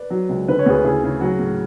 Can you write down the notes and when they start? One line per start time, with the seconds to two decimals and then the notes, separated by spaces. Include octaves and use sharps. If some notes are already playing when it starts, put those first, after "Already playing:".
Already playing: B4 D5
0.10 F#3
0.29 C#2
0.48 D3 B4
0.59 C#5
0.66 D2 G#4 B4
0.84 C#3 E4 G#4
1.03 C#3
1.21 F#3 F#4
1.39 A2